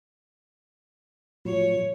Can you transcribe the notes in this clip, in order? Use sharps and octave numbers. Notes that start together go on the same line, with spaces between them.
A2 F3 F#3 C#5